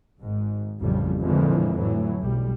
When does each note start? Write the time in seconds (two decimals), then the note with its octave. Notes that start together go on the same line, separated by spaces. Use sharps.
0.21 G#1 G#2
0.81 A1 F2 C#3 G3
1.20 F2 A#2 D3 E3 F3 G#3
1.78 A2 E3 F#3 A3
2.20 B1 G3